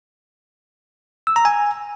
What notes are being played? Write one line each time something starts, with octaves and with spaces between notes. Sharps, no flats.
E6
A#5
G#5